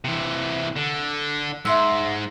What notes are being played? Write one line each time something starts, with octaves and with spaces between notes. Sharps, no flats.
C3 E3
D3
G#2 E5 C6 E6